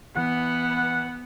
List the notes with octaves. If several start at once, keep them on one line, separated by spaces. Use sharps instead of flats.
E3 B3 F#5